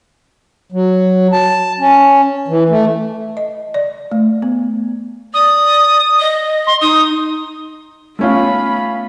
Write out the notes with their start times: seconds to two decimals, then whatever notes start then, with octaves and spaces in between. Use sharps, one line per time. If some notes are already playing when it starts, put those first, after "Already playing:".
0.72 F#3
1.33 A5
1.80 C#4
2.48 E3
2.70 A3
3.37 D#5
3.74 D5
4.12 A3
4.42 B3
5.34 D5 D#6
6.20 D#5
6.67 C6
6.81 D#4 D#6
8.19 A3 B3 C#4 F4 B5